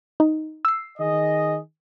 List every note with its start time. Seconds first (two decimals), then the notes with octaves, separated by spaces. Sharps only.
0.20 D#4
0.65 E6 C7
0.98 D#3 G#4 D#5